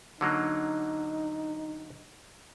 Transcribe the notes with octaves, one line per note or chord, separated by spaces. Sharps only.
D3 F#3 A#3 D#4